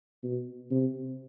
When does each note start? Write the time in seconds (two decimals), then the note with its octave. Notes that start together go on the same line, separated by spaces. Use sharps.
0.23 B2
0.71 C3